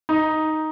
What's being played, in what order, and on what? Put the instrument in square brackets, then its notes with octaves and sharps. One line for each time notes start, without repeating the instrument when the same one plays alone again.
[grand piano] D#4